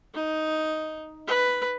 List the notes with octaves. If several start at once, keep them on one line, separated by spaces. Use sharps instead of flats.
D#4
B4